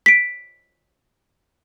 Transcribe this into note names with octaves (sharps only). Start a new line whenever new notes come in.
B6 D7